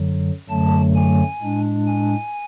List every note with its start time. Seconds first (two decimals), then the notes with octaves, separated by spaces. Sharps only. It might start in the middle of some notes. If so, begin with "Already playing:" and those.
Already playing: F#2 D3 F#3
0.49 F#2 D3 F#3 A3 A5
0.95 G#5
1.42 A2 G#3 D4
1.87 G#5